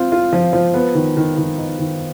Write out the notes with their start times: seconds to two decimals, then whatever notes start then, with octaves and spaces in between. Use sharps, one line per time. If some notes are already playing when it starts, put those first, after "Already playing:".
Already playing: C4 F4
0.12 F4
0.33 F3
0.53 F3
0.74 B3
0.95 D#3
1.17 D#3
1.38 D#3
1.58 D#4
1.79 D#3